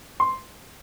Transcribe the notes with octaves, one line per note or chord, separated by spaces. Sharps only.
C6